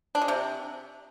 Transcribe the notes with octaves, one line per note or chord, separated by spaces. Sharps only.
D4
G#3
C3